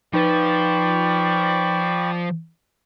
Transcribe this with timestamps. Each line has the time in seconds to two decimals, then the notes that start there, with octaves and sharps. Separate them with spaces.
0.14 F3 D#4 B4 D5 G5 B5 C#6